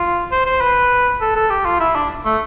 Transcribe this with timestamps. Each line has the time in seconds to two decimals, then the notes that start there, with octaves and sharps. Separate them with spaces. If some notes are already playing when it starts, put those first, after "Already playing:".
Already playing: F4
0.32 C5
0.46 C5
0.61 B4
1.21 A4
1.36 A4
1.50 G4
1.66 F4
1.80 E4
1.95 D4
2.25 A3